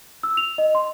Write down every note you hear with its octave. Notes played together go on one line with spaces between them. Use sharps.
E6
F7
D#5
C6